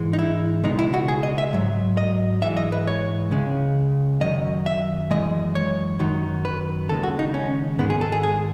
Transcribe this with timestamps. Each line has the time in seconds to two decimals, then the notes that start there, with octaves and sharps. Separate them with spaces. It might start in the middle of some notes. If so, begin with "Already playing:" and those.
Already playing: G#2 E3 G#3
0.13 D#4
0.19 E4
0.63 C#2 B2 G#3 D#4
0.79 E4
0.94 F#4
1.08 G#4
1.23 D#5
1.38 E5
1.53 G#2 F#3
1.97 D#5
2.42 G#2 E3 G#3 E5
2.57 D#5
2.72 B4
2.87 C#5
3.31 C#2 C#3 G#3
4.21 F#2 D#3 F#3 D#5
4.66 E5
5.11 F#2 E3 G#3 D#5
5.55 C#5
5.99 F#2 D#3 F#3
6.45 B4
6.89 D#2 C#3 G#3 A4
7.03 F#4
7.19 D#4
7.34 C#4
7.79 G#2 D#3 G#3 B3
7.90 G#4
8.01 A4
8.12 G#4
8.23 G#4